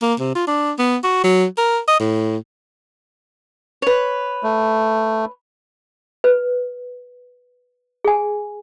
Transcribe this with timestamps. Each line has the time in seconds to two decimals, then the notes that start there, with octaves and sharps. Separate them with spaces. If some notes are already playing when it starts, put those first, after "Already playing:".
0.02 A#3
0.20 C3
0.35 F4
0.47 D4
0.79 B3
1.03 F#4
1.24 F#3
1.58 A#4
1.88 D#5
2.00 A2
3.82 B4 C#5
4.43 A3
6.24 B4
8.04 G#4 G#5